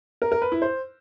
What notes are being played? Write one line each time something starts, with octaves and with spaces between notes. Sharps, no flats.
A#4
A#4
B4
E4
C5